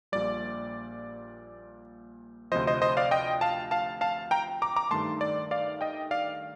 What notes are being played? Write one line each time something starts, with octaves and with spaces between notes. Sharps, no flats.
A#1 A#2 G3 D5
D2 C3 F3 C5 D#5
C5 D#5
C5 D#5
D5 F5
D#5 G5
F5 A5
F5 A5
F5 A5
G5 A#5
A#5 D6
A#5 D6
G2 D#3 A3 A5 C6
D5
D5 F5
D#5 G5
D5 F5